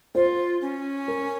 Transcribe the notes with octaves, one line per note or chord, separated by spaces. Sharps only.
F4 C5
C#4
A#4